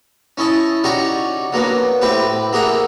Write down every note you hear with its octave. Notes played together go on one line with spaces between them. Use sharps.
C#4 E4 D#5 A5
C#4 D#4 F#4 G4 C#5 D5
F#3 A#3 B3 D4
A2 C4 G4 B4
A#3 G4 G#4 E5 F#5 A#5